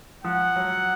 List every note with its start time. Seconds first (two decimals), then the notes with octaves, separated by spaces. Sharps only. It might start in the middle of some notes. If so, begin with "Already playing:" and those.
0.24 F3 F#5
0.56 F#3